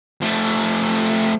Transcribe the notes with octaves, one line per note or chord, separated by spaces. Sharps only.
F3 A3